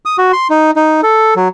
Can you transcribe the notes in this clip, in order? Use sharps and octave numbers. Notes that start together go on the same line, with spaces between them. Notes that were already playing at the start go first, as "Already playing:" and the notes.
D#6
F#4
C6
D#4
D#4
A4
F#3